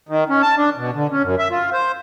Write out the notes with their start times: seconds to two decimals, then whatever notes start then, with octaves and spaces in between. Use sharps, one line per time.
0.09 D#3
0.30 C#4
0.42 A5
0.57 D4
0.78 B2
0.95 D3
1.12 C#4
1.23 F#2
1.39 E5
1.51 F4
1.73 C5